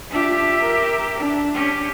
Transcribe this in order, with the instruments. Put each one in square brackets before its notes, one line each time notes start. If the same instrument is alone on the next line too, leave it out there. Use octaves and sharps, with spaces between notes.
[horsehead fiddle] D4 F4 [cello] G4 E5
[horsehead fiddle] A#4
D4
[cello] C#4 G4